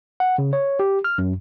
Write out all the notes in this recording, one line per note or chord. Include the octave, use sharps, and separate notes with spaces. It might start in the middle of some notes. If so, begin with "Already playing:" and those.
F#5
C#3
C#5
G4
F6
F#2